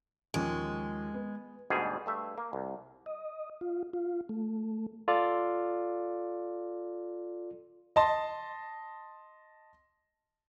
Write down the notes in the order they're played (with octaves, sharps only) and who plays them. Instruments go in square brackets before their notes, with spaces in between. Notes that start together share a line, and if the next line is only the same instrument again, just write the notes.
[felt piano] D#2 F3 C#4 [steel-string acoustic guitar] G#3
[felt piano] B3
[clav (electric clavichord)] D2 G#2 B2 G3 G#4
G2 A3 E5
A#3
C2
[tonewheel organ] D#5
F4
F4
A3
[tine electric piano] F4 A4 D5
[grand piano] D#5 A5 C6